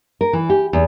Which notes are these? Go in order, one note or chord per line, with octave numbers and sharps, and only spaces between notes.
A#4
E3
G4
E2